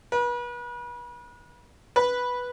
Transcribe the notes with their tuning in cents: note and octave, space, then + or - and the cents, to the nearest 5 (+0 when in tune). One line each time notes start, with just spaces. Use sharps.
B4 -35
B4 -5